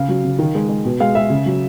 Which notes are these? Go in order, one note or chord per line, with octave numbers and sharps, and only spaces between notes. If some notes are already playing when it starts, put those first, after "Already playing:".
Already playing: C#3 F5
F#3
C#3
D#3
G#3
G#3
B2
G#3 F5
G#3 E5
C#3
F#3